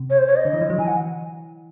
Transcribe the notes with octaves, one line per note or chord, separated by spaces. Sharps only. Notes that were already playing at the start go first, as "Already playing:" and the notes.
Already playing: C3
C#5
C5
C#5
D#5
D3
E3
F3
F#3
E3 G#5
F#5